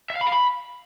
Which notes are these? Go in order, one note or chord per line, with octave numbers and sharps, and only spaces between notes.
E5
F5
B5
F5
B5